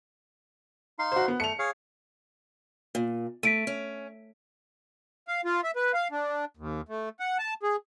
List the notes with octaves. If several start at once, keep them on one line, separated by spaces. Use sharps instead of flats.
D#4 F5 C6
F#4 C5
B3
A3 C#7 F7
G#4 C#5 F5
A#2
A3 B6 D7 D#7
C#4
F5
F4
E5
B4
F5
D4
D#2
A3
F#5
A5
G#4